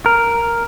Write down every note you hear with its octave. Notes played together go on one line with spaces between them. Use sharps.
A#4